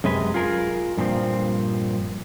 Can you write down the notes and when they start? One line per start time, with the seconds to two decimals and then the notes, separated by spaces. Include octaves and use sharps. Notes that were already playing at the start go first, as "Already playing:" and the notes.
0.04 F#2 C3 G#3 B4
0.34 F4 G#4 A#4
0.97 G2 A#2 F3 C4